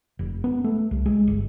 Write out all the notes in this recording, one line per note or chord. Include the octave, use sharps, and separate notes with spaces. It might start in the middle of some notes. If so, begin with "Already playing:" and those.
F1
B3
A3
C2
G#3
G1